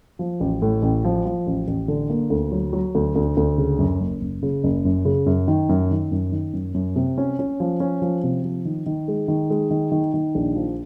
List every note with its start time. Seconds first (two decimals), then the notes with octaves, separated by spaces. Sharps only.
0.19 F3
0.40 A1
0.62 A2
0.82 A1
1.05 F3
1.25 F3
1.47 A1
1.68 A1
1.88 D3
2.10 A#3
2.30 D2
2.52 F#3
2.73 F#3
2.95 D2
3.16 D2
3.37 D2
3.58 C#3
3.79 F#2
4.00 F#1
4.21 F#1
4.43 C#3
4.64 F#1
4.85 F#2
5.05 C#3
5.26 F#2
5.48 D#3
5.69 F#2
5.91 D#3
6.12 F#2
6.32 D#3
6.53 F#2
6.74 F#2
6.96 C3
7.18 C#4
7.39 C#4
7.60 F3
7.80 C#4
8.02 F3
8.24 C3
8.44 F3
8.65 D#3
8.86 D#3
9.08 G#3
9.28 D#3
9.50 G#3
9.71 D#3
9.92 D#3
10.14 D#3
10.35 A#1
10.55 F3